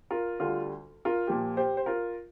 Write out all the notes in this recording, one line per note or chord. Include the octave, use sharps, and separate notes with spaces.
F4 A#4
D2 D3 G3 F4
F4 A#4
A#2 F3 A#3 G4
G4 C5
C5
F4 A#4